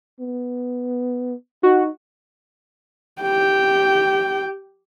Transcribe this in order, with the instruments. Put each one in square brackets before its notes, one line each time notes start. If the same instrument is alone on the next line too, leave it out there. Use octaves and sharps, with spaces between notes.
[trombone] B3
[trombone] D#4 [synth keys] F#4
[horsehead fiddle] G4 G5